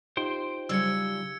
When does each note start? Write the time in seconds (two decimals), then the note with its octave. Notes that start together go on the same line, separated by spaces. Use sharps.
0.17 D#4 F4 G4 C5 G5 C6
0.69 C#3 F#3 G3 E6 G#6 C#7